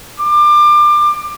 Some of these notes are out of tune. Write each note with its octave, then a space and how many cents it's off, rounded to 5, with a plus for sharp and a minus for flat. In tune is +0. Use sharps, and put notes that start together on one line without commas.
D6 +25